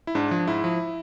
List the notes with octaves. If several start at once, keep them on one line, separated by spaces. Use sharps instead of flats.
E4
G#2 D4
F3
G#2 E4
F3